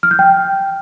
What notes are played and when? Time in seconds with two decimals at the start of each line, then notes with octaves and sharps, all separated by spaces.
0.03 F6
0.11 G6
0.19 G5